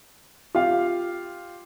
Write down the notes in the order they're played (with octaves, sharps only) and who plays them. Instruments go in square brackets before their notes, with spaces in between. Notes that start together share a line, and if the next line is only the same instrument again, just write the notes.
[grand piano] F4 G4 F5